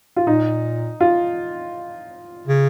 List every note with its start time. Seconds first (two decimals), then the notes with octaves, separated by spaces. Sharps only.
0.16 F4
0.27 A#2 D#4
1.01 F4
2.47 C#3